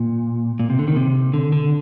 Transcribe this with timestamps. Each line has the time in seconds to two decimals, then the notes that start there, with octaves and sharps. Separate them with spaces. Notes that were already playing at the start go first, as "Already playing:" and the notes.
Already playing: A#2
0.60 A#2
0.70 C3
0.79 D3
0.88 D#3
0.96 C3
1.34 D3
1.52 D3